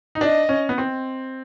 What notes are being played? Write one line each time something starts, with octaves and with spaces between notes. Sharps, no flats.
D#4
D4 D#5
C#4
B3
C4